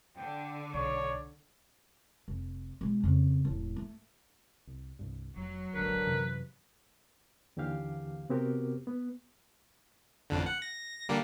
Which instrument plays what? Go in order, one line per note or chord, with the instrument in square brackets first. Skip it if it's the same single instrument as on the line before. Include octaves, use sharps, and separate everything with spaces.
[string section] D3 [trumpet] G5
[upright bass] B1 [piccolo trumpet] C#5 [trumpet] D5
[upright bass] F1
B2 G#3
F2 C#3
E1 A2
A3
[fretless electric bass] C2
C2 G2
[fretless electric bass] F1 [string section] F#3
[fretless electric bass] D#1 G#1 [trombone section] D3 A#4 [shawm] B4
[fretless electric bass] F#2 C3 E3
[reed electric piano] D#2 D3 E3 G4 F5
C3 B3 C4 F#4 G4 A#4
B3
[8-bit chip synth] A1 F2 D3
F#5
A#6
D3 G3 A#3